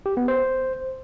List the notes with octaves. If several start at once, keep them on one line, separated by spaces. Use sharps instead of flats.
G4
B3
C5